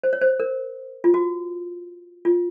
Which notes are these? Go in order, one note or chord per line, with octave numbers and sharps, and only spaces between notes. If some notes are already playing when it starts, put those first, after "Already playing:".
C5
C#5
C5
A#4
F4
F#4
F4